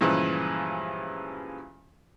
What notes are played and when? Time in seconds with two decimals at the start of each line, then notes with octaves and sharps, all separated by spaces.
0.01 G2 A#2 C#3 E3 F3 G#3